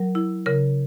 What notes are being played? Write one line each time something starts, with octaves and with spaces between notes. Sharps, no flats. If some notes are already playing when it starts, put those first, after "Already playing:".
Already playing: F#3 A#4
E4
C#3 A#4